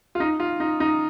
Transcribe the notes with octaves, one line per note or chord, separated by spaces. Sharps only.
F4
D#4
F4
D#4
D#4